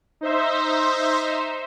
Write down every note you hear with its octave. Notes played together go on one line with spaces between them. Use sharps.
D#4 C5 E5